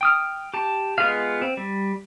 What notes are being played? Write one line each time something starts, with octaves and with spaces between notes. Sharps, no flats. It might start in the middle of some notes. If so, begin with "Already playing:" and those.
G5 D#6 F6
G4 A5
G#3 B3 F4 G#4 F5
C4
G3